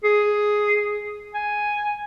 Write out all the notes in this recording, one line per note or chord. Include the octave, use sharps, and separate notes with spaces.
G#4
G#5